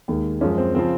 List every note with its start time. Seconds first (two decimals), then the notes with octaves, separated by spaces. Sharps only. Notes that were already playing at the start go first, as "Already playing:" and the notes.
0.08 D#2 D#3 G#3
0.41 F#2 F3 G#3 C#4
0.58 C4
0.75 C#3 F3 C4